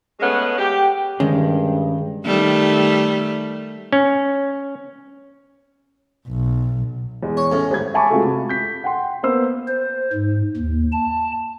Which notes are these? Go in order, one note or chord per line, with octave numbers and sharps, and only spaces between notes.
G#3 A3 B3 C#4
G4
G2 D#3 G#3 C#4
D#3 G3 A3
C#4
B1
E2 G#3
C#5
A2 C#4
G#1 G4 G#6
E5 G#5 A5 B5 C#6 D6
G#3 A3 C4 F4 F#4 A4
C3
G6 B6
F#5 G5 C6
A#3 B3 C5 E6
C5
G#2
D#2
A5